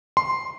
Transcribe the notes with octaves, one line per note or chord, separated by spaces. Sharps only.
C6